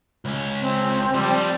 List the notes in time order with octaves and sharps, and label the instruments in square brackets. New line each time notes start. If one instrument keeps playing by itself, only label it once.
[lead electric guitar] C#2 C#4
[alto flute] C4
[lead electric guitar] F3 G4 [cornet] G3